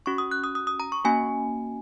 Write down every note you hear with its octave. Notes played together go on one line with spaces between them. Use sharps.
C#4 F#4 C#6
D#6
F#6
D#6
D#6
D#6
A#5
C#6
A#3 C#4 F#4 G#5